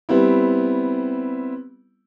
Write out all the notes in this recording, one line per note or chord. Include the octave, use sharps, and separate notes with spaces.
G3 B3 C4 E4